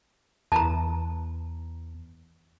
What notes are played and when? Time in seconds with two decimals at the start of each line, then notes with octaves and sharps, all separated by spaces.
0.52 E2 A5 A#5